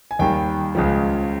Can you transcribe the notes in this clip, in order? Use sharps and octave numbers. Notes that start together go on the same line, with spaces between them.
G#5
D#2 D#3 G3 G5
C#2 C#3 F3